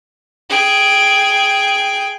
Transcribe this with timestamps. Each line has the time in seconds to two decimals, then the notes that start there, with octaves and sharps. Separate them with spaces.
0.50 G#4 G5